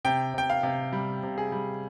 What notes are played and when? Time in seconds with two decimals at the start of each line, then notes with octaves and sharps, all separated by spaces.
0.05 C3 G5
0.34 C3 G5
0.50 F5
0.63 C3
0.93 G3
1.23 C3
1.38 G#4
1.52 G3